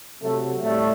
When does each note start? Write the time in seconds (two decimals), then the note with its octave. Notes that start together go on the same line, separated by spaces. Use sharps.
0.21 C3 F#3 A3
0.62 A2 G3 A3